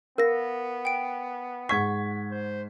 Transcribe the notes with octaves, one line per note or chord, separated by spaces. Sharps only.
B3 A#4 F5 A#6
G5 D7
G#2 F#5 C#6 G#6 B6
C5